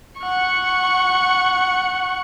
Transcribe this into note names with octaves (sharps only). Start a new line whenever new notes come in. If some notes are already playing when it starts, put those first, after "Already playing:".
F#5 C#6